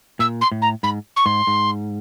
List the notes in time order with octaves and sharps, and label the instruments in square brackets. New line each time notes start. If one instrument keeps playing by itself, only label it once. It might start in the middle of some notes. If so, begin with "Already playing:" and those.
[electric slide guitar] A#2 [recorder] E6
[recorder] C6
[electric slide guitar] A2
[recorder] A#5
[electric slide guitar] G#2 [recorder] B5
[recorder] C#6
[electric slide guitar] G#2 [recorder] C6
[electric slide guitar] G#2